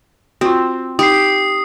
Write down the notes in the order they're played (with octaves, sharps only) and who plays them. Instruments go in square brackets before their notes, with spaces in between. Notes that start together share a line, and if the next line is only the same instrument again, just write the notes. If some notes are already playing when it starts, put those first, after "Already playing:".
[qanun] C4 [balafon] F4 F#4
[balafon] D#4 [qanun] G4 [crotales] D#6 C7